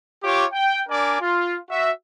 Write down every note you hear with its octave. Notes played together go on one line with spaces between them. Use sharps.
F4 G4 C#5 D6
G5
D4 A#4 D5 G#5 D6
F4
F#4 E5